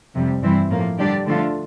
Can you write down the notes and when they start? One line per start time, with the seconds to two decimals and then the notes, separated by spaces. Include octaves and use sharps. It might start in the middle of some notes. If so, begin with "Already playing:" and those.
0.14 F2 C3 G3
0.41 G2 E3 G3 C4 E4
0.70 A2 F3 A#3
0.98 D3 G3 D4 G4 D5
1.27 D3 F3 A3 D4 F4